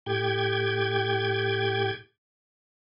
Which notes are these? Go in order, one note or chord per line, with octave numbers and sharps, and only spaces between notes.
A2 G4 G5 G#6